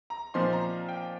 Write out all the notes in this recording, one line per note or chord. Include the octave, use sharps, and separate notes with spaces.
A#5
A#2 F3 C4 D#4 C6
A#5
G5